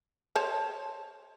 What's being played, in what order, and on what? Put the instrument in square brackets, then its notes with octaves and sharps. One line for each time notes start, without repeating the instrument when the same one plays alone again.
[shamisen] C5 C#5 A5